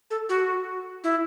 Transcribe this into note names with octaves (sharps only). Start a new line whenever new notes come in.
A4
F#4
E4